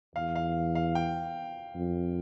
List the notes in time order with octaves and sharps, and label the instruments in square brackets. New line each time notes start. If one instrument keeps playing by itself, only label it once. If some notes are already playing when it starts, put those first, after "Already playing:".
[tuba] E2 [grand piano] F5
[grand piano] F5
F5
G5
[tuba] F2